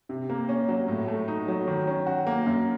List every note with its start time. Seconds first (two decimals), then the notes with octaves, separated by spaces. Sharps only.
0.09 C3
0.29 A#3
0.49 C#4
0.68 F#3
0.88 A2
1.08 A3
1.28 D#4
1.48 F#3
1.67 D#3
1.87 C#4
2.06 F#4
2.27 A#3
2.46 F#2